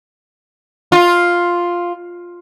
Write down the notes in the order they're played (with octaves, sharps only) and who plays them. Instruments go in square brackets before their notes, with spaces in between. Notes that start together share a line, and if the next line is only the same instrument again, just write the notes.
[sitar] F4